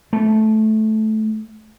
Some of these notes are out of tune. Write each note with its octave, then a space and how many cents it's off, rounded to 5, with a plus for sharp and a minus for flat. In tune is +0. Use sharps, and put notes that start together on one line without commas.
A3 -15